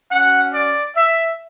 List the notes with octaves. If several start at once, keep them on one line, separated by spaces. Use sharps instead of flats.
C#4 F#4 F#5
D5
E5